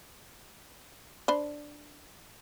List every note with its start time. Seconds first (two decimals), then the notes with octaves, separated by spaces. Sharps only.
1.28 D4 C5 B5